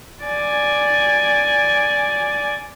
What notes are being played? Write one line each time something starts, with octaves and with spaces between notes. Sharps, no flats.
D5 G#5